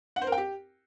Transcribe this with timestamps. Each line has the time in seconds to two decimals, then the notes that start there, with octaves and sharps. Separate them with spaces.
0.16 F#5
0.22 C5
0.27 A#4
0.32 G5
0.38 G4